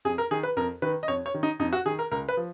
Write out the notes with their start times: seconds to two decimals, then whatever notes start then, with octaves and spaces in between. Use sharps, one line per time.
0.05 F2 G#4
0.18 A#4
0.31 D#3 G#4
0.43 B4
0.57 F2 A#4
0.82 D#3 B4
1.03 D#5
1.08 F2 C#5
1.26 C#5
1.34 D#3
1.43 D#4
1.60 F2 D#4
1.73 F#4
1.86 D#3 G#4
1.99 A#4
2.11 C#2 A#4
2.29 B4
2.37 F3